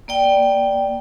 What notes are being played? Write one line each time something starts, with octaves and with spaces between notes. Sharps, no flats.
A#3 D5 G5